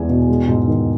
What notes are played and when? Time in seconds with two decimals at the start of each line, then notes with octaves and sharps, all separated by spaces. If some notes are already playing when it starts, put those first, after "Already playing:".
Already playing: E2 E3 G#3 G#5
0.09 B2
0.28 G#3
0.48 G#2
0.67 D#3